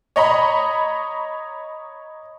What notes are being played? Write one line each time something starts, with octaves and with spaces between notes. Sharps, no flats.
C#5 D#5 A#5 B5